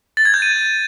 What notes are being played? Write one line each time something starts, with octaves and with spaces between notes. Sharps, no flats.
A6
G#6
G6
D#7